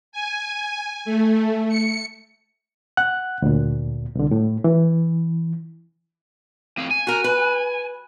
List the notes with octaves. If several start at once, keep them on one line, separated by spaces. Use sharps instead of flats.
G#5
A3
C#7
F#5 F#6
D2 A#2
C2 D3
A2
E3
A2 C4 F5
G#5
F#4 A#4
B4